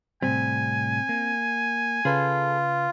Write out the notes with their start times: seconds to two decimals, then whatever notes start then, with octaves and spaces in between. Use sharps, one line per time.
0.23 A2 C3 G3 C4 G#5
1.09 A#3
2.05 C#3 F4 G#4 A4 B4